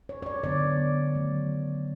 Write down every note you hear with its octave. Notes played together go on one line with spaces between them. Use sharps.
C#5
C#5
D5
D3 F#3 B3 D5
D#3 F#3 A3